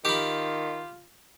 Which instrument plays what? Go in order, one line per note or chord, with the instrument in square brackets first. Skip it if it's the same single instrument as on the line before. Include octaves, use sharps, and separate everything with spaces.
[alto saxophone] D#3 [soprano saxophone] F4 [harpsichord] G4 B5